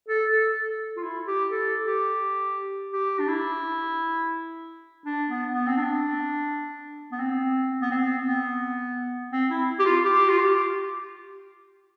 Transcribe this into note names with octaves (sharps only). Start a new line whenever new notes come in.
A4
A4
F4
E4
G4
A4
G4
G4
D4
E4
D4
B3
B3
C4
D4
B3
C4
B3
C4
B3
C4
E4
G4
F4
G4
F4
G4